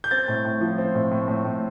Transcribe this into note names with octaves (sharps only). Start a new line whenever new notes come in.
G6
C4 A6
A2
A2
F3
C4
A2
A2
A2
A2